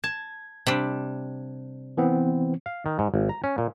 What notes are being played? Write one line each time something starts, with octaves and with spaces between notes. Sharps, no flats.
A5 G#6
C3 G3 D4
E3 B3 C4
F5
D#3
G#2
G#1
A#5
C#4
A#2